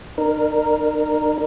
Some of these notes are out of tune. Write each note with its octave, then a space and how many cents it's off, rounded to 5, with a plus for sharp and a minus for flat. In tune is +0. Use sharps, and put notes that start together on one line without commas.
D#4 -45 A#4 +0